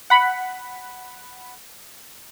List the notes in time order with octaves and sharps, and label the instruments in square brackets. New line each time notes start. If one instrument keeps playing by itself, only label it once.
[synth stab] F#5 B5